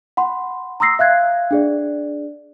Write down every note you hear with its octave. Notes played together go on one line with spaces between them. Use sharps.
F#5 B5 C6
A#5 C6 D#6 E6 A#6 C7
E5 F5 F#6 G#6
D4 G#4 D5